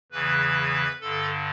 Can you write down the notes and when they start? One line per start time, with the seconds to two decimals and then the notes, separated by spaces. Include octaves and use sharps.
0.11 E2 C#3 E3 B4
1.01 G2 D3 A4